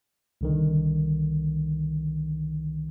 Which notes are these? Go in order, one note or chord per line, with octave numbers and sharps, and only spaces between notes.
C2 D3 D#3